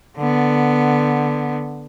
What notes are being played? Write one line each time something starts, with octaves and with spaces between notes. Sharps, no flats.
D3 B3